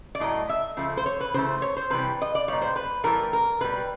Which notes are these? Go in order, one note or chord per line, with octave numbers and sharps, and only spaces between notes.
D5
A2 F#3 A3 D#5
E5
C#3 F3 A3
C5
C#5
B4
C#3 E3 A3 C5
C#5
C5
C3 E3 G3 B4
D#5
D5
A#2 G3 C#5
C5
B4
A2 E3 G3 A#4
A#4
B2 G3 B4